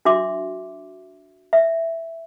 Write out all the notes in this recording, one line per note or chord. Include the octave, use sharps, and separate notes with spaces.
D4 F#4 E5 C6 D6
E5